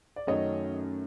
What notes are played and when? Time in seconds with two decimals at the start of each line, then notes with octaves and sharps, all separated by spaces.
0.16 D5
0.27 F#2 D#3 F#3 A3 C#4 C#5 D#5